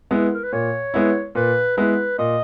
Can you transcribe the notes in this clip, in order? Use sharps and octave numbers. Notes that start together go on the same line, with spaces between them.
G#3 B3 E4
A#4
B4
A#2 C#5
G#3 B3 E4
A#2 B4
G#3 B3 E4 B4
A#2 D#5